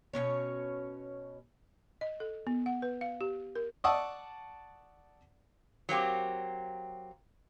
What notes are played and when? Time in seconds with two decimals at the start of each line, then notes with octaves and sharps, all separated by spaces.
0.13 B2 D3 C#4 C#5
2.01 D#5
2.20 A4
2.47 B3
2.66 F#5
2.82 B4
3.01 F5
3.21 G4
3.55 A#4
3.84 D5 F#5 A5 C#6 D#6 E6
5.89 F#3 A#3 C4 G4